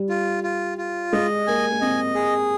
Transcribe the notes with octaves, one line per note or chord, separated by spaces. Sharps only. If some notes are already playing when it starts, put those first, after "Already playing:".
Already playing: G3
F4
F4
F4
G#3 D#5
A#3 G#5
A#3
C4 D#5
G#4